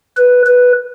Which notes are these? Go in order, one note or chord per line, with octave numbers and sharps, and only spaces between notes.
B4
B4